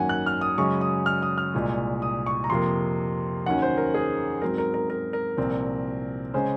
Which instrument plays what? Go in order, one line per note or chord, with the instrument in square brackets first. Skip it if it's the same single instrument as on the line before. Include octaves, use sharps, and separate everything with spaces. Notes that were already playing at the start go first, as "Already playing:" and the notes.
Already playing: [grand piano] G#1 F#2 D#3 A#3 C#4 F#5 G#5
F#6
F6
D#6
F#2 C#3 G#3 C#4 C#6
D#6
F6
D#6
F6
C2 A#2 G#3
D#6
C#6
A#5
F2 C3 F3 A#3 C6
D#2 D#3 F#3 C#4 F#5
C5
A#4
G#4
G#2 F#3 C4 A#4
A#4
A#4
A#4
A#4
C2 A#2 F3 C4
C#3 G#3 C#4 C5